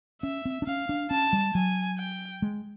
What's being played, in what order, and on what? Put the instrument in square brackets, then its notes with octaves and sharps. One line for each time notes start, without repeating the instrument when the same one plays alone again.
[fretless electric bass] C#4 [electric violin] E5
[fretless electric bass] C4
D4
[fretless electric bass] C#4 [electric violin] F5
[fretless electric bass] D4
[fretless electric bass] C#4 [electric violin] A5
[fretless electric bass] G3
[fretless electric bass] F#3 [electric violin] G#5
[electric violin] G5
[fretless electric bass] G#3